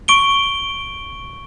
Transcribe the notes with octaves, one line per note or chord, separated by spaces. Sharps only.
C#6 D7 G7